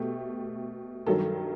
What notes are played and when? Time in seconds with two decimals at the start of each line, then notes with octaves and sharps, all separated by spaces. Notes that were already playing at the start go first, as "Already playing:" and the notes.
Already playing: B2 A3 G4
1.06 G2 D#3 F#3 A4